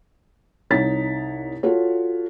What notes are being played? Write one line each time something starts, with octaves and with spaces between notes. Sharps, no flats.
C2 D#4 C#5 A6 B6
F4 F#4 A4 C#5